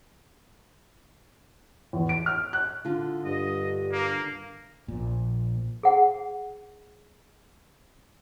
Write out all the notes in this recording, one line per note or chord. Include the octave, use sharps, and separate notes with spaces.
E2
D7
F6
F#6
D3 F4
G2 D#5
A#3
A#1 A#2
G#4 F#5